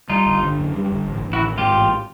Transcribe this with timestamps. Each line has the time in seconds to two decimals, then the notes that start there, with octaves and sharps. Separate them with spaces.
0.10 G3 D#4 F4
0.26 G1
0.43 D3
0.59 F#2
0.75 G3
0.92 G1
1.09 A1
1.25 A1
1.33 E4 F#4
1.42 D#3
1.58 G#2 F4 G4
1.75 A1